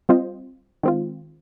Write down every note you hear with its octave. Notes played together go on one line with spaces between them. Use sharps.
G3 C4 F4 C5 D#5
D#3 G#3 C4 F4